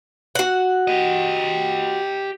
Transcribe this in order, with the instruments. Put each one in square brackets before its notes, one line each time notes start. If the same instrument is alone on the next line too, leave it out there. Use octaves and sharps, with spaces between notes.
[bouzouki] F#4 F#5
[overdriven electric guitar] G4 D#5